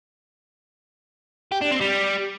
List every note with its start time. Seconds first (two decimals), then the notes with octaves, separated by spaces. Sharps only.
1.52 G4
1.62 D4
1.71 C4
1.81 G3